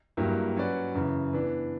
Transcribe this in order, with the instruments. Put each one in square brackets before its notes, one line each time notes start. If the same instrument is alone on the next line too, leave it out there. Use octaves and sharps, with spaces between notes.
[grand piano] G2 F#3 A#3 E4 G4
F#3 C#4 F#4 B4 D5
F#2 C#3 E3
E3 B3 D4